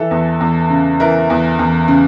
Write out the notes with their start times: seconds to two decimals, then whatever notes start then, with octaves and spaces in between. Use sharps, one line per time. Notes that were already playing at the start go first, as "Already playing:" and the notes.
Already playing: E3 A4
0.11 E2
0.40 E2
0.70 C#3
1.00 E3 A#4
1.30 E2
1.59 E2
1.88 C#3